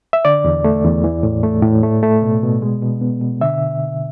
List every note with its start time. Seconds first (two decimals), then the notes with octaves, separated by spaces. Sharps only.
0.13 E5
0.25 D3 D5
0.44 E2
0.64 A3
0.85 E2
1.04 E3
1.23 A2
1.43 A3
1.63 A2
1.83 A3
2.03 A3
2.22 B2
2.43 B2
2.62 G#3
2.82 B2
3.01 B3
3.21 B2
3.41 D3 E5